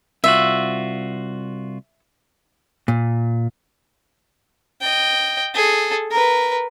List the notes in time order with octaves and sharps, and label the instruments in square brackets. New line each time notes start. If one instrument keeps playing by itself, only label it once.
[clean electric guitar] C2 F4 F#4 [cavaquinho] E5
[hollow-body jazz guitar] A#2
[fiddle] D#5 G5
G#4 A4
A#4 B4